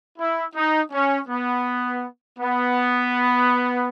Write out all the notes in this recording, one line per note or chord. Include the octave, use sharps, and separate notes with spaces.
E4
D#4
C#4
B3
B3